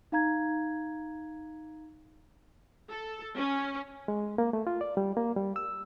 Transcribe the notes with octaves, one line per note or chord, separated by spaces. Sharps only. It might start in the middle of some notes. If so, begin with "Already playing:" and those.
D#4 F5 A#5 G#6
A4
C#4
G#3
A#3
A3
F4
D5
G3
A#3
G3
E6